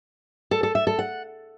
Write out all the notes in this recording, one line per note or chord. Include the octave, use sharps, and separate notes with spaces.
A4
A4
E5
A4
F#5